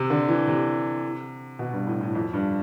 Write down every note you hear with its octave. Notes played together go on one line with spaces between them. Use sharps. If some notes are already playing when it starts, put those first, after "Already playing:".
Already playing: C3
D3
E3
C3
B2
G2
A2
A2
F2
G2